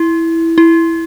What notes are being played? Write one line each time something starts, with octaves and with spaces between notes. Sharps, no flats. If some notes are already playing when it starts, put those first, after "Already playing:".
Already playing: E4
E4